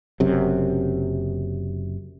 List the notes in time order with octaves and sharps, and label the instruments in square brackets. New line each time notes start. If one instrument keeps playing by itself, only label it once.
[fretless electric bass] F#1 F#2 C3